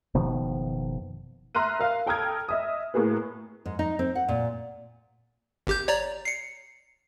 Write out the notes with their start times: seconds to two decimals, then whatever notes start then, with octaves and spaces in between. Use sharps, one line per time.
0.14 F#1 B2 D#3 F3
1.55 E5 A#5 C6 F6 F#6 D#7
1.79 A#4 F5
2.06 A4 G5 A#5 D#6 F6 G#6
2.49 D#5 E5 D#6
2.94 A2 A#3 G#4 B4
3.66 G#2
3.79 D#4
3.99 C4
4.15 F#5
4.28 A#2
5.67 G#1 G4 G6
5.88 C#5 D5 A#5
6.25 C7 C#7